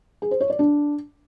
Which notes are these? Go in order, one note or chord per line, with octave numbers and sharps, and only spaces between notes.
G#4
C5
C#5
D5
D4